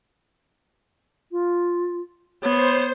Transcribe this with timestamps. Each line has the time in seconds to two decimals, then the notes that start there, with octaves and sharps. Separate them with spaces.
1.32 F4
2.43 B3 C5 C#5